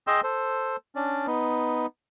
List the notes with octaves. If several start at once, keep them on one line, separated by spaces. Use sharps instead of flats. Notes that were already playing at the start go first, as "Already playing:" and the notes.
G#4 D#5 G5 C6 E6
A4 C5
C#4 D4 D5
B3 D#4